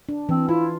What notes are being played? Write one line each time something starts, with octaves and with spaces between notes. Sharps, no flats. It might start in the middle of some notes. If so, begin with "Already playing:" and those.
D4
E3 C4
E4 F4